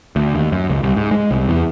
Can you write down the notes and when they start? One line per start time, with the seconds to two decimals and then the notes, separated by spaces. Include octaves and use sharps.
0.16 D2
0.35 D#2
0.52 F#2
0.69 C#2
0.83 C2
0.97 G#2
1.11 G#3
1.31 C2
1.49 E2